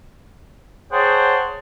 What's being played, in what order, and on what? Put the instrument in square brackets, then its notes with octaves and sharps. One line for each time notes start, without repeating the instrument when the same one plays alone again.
[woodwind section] G#4 C5 C#5 F#5 G5 A5